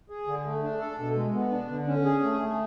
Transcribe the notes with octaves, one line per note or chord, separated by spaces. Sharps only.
G#4
D3
A3
D4
A4
B2
G#3
B3
D4
D3
C#4
G#4
A3
A3